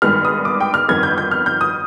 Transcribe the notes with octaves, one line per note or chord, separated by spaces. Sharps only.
G#1 G2 D#3 G#3 B3 F6
D#6
D6
G5
F6
G1 F2 D#3 B3 G#6
G6
G6
F6
G6
D#6